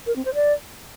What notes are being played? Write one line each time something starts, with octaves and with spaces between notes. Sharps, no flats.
A#4
C4
C5
D5